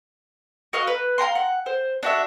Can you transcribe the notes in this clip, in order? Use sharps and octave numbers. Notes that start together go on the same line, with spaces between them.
F#4 A#4 D#5 F5
B4
F5 G5 A#5 C6
F#5
C5
D4 F#4 E5